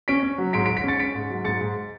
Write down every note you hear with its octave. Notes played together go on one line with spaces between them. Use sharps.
C#4 B6 D7
C#4
F#3
G#2 B6 D7
B6 D7
G#2
B6 D7
C#4 A6 C#7
C#4 B6 D7
G#2
F#3
G#2 A6 C#7
G#2